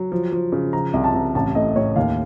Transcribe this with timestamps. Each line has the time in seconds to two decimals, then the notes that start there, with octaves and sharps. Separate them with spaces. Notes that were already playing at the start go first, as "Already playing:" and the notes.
Already playing: F#3
0.12 F3
0.32 F3
0.52 C#3
0.73 F3 A#5
0.94 C2
1.04 A5
1.14 C2
1.35 A1 A5
1.55 A2 D#5
1.76 A2 C#5
1.96 D#2 F5